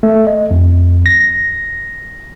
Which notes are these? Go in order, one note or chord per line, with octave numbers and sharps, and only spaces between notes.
A3
D#5
F2
A#6